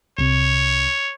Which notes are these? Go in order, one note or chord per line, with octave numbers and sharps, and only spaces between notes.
C2 C3 C#5